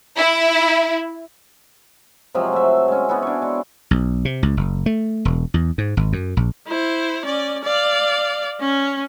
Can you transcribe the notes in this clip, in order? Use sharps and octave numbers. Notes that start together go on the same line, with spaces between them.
E4
C3 F3 F#3 G#3
A3 E5
G#3 C#4
B3 C#4 E4 F#4
D4 C#5
G#3
B1
C3
C#2
F#1
A3
E1
E2
G#2
G#1
F#2
A#1
E4 C5
C#4 D5
D5 F5
C#4